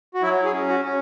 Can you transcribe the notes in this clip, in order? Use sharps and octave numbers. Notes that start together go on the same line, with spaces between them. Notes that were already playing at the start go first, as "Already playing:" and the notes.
F#4
F#3 E4
G#4
C#4
F#4
C#4